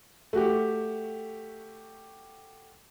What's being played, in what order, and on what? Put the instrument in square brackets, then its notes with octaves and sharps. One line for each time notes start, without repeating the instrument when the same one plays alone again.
[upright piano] A3 F#4 G4